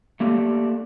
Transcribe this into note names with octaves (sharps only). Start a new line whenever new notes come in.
A3 A#3 D4 G4 A4